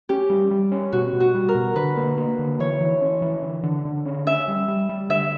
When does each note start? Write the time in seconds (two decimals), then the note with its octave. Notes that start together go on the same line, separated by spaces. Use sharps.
0.09 C#4 G4
0.30 G3
0.51 G3
0.72 C#4
0.92 B2 F#4
1.13 B2
1.20 F#4
1.34 G3
1.49 A#4
1.55 B2
1.76 D3 B4
1.97 A#3
2.18 A#3
2.39 D3
2.59 E3 C#5
2.81 E3
3.01 C#4
3.22 E3
3.42 D3
3.63 D3
3.85 D3
4.05 C#4
4.27 C#4 E5
4.48 G3
4.68 G3
4.89 G3
5.09 D3 E5